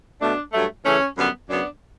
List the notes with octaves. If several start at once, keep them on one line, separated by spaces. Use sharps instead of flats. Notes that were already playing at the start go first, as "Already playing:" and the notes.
B2 A3 D4
G2 F#3 A3
C#3 E3 A3 C#4
F#2 D3 G3 B3
F#2 C#3 F#3 B3 D4